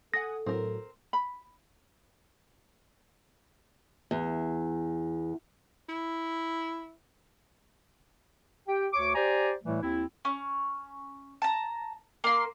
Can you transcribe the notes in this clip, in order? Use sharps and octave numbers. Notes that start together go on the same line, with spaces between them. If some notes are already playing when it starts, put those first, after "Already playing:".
A4 F#5 G#5 D#6 A#6
A2 F#3 C4 A#4
B5
E2
E4
G4 G5
D2 C#5 C#6 D6
G4 C5 D5 G#5 A#5
A2 E3 G3 A3
D#2 C4 E4
C#4
A5 A#5
A#3 C6